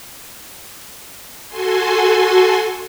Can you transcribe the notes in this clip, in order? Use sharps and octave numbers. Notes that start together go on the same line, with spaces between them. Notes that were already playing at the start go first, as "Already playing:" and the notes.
F#4 A4 G#5 C6